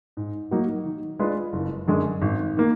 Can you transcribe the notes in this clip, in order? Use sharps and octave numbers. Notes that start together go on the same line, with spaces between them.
G#2
F#3 A#3 D#4 F#4
D#3
G#3 D4 F4 B4
F#1
F#2 D3 G#3
G#1
D#3 A#3